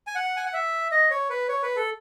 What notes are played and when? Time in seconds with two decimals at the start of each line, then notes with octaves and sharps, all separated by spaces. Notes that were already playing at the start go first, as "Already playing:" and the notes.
0.07 G#5
0.15 F#5
0.37 G#5
0.46 F#5
0.54 E5
0.92 D#5
1.11 C#5
1.30 B4
1.49 C#5
1.63 B4
1.76 A4